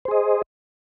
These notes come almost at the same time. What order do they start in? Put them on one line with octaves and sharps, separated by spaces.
C5 G#4 D#5